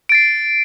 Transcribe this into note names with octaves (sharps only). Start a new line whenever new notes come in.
A6 C7 D7